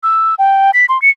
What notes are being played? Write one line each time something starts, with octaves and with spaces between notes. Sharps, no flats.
E6
G5
B6
C6
C#7